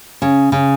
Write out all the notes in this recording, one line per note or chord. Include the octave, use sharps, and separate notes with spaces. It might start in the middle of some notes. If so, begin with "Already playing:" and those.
C#3
C#3